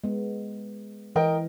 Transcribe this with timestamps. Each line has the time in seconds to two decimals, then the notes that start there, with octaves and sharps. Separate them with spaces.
0.04 G#3 B3
1.16 E3 A#4 D#5 G5